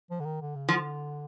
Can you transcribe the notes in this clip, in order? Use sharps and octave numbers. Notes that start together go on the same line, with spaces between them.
F3
D3
D#3
D3
C#3
D3 F3